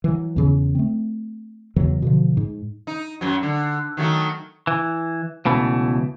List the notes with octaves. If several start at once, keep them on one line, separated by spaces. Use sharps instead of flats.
E3 F#3
E2 C#3 E3
A3 C4
E2 C#3 E3 F#3
B2 D3 F3
G#2
D#4
F#2 F#3
D3
D#3 F#3 A3
E3
C#2 B2 E3 A3